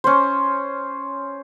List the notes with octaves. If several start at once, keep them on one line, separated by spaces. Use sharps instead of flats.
C#4 C5